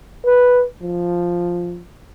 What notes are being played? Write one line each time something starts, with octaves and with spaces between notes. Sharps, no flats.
B4
F3